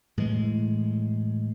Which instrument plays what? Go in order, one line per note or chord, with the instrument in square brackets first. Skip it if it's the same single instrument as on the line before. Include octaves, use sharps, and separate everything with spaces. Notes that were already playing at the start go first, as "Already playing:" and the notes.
[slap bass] A2 E3 G#3